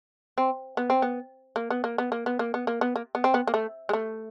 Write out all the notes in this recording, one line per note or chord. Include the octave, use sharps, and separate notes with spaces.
C4
B3
C4
B3
A#3
B3
A#3
B3
A#3
B3
A#3
B3
A#3
B3
A#3
B3
C4
B3
A#3
A3
G#3
A3